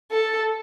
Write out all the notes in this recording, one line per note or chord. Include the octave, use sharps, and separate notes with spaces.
A4